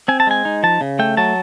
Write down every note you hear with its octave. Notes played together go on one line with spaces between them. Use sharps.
C4 G#5
A5
G#3 G#5
D#4
F3 A5
C#3
A3 G5
F#3 A5